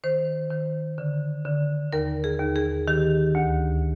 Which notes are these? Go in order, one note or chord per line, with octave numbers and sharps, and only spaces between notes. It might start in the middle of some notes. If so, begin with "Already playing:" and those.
D#3 C5
D#3
D3
D3
D#2 A#4
G#4
D#2
G#4
D#3 G4
D2